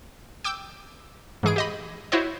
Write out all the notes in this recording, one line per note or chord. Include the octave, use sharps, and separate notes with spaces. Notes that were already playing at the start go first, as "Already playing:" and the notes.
G5 D6 E6 G6
G#2 E3 G#4 D7
G4 D#5 B5
E4 F#4 C5 C#5 D#5